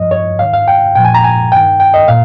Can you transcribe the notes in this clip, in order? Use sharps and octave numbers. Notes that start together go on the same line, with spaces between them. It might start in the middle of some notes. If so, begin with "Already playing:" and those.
Already playing: G2 F3 D#5
C#5
G#2 D#3 F5
F5
G5
A#2 F3 G5
G#5
A#5
G#5
G2 D#3 G5
G5
D#5
A#2 F5